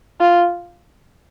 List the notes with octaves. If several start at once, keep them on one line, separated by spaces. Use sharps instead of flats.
F4